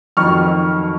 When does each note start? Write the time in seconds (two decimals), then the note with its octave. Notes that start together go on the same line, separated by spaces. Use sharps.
0.17 F2 D#3 F#3 C#6 F6